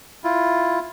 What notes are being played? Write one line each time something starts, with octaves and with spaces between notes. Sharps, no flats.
E4 F4